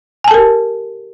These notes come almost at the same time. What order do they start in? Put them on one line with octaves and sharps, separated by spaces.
G#5 A5 A4 A#4 G4